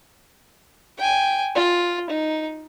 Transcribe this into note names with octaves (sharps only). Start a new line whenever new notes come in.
G5 G#5
F4
D#4